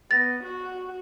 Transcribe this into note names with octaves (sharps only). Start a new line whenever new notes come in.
B3 A6 A#6
F#4